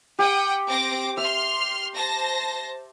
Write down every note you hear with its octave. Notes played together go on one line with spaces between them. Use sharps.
G4 F#5 G5 D#6
C4 D6 A#6
E5 C6 F6
C5 A5 A#6